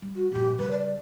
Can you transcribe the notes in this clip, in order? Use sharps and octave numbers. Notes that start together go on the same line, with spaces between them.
G3
F#4
A#1 G2 G4
C#3 G3 B4
D5